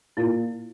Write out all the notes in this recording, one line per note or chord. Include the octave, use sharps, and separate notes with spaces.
A#2 E4